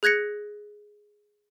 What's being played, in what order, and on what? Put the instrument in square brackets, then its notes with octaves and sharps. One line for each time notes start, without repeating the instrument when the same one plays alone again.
[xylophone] G#4 F#6 G#6 A#6 C#7